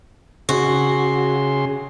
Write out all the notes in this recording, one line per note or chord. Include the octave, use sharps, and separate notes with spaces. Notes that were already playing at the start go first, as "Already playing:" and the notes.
C#3 F#4 G#4 C6